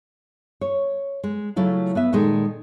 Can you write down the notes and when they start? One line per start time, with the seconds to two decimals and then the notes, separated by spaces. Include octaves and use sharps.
0.61 C#5
1.24 G#3
1.56 C#3 F#3 A3 E4 F4
1.95 B3 B4 E5
2.13 A#2 D#3 G#3 G#4 A4